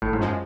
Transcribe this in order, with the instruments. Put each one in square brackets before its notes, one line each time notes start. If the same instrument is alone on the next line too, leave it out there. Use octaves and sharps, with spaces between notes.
[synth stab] G#1 [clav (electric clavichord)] A2
[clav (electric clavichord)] G#2
[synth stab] F#2 F3 G#3